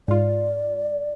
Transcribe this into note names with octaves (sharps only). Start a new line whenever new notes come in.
G#2 F4 D5